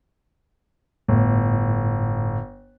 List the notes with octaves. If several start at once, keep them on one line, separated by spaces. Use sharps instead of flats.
G1 A2